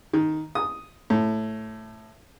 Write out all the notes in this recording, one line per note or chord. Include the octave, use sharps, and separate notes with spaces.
D#3
D#6
A2